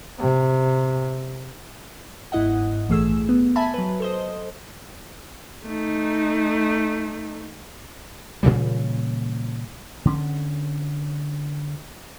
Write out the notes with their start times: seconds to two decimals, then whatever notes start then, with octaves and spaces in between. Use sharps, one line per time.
0.20 C3
2.32 G1 G#2 E4 D#5 F#5
2.89 A#1 E3 A3 G#4 E6
3.29 B3
3.56 E5 G#5 A5 B5
3.74 F#3 B4
4.00 A4 C5 D#5
5.66 A3 D#4
8.43 A#2 C#3 E3 G3
10.05 D3 C4 C#4